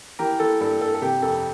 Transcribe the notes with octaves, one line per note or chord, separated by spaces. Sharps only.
E3 G4 A#4
E3 A4
G2 A4
G2 A4
A4
C3 G4
F2 A4